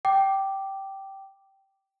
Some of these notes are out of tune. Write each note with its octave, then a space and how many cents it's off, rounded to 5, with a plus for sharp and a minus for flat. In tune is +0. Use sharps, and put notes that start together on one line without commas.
G5 -10 D6 +5